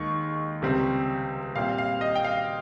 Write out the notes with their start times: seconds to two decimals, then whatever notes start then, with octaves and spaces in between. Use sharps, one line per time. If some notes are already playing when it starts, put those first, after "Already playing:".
Already playing: D#2 D#3 G#3 C#6
0.62 C#2 C3 G3 C4
1.55 A#2 G3 C4 F5
1.78 F5
2.01 D#5
2.15 G5
2.24 F5